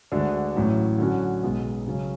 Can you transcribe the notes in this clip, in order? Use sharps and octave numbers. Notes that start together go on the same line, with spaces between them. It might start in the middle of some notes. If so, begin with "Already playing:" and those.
D2 D3 G#3 D4 F#4
A1 A2 F#3
D3 F#3 C#4 F#4
B1 B2 G#3
C#3 F#3 C#4